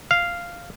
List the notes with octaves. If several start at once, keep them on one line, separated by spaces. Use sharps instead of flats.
F5